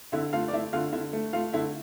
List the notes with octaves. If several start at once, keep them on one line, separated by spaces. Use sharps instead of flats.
D3 E4 E5
A3 F4 F5
D5
A3 E4 E5
D3 F4 F5
D3 E4 E5
A3
A3 F4 F5
D3 E4 E5